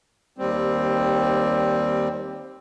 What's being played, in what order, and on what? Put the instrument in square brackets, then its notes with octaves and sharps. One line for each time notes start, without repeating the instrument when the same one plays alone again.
[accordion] D#2 G3 C4